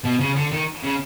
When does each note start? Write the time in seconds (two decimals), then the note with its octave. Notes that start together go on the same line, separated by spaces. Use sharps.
0.04 B2
0.20 C#3
0.36 D3
0.52 D#3
0.83 C#3